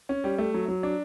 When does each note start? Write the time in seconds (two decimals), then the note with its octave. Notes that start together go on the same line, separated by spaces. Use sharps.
0.09 C#4
0.24 G3
0.38 A3
0.54 F#3
0.68 F#3
0.83 D4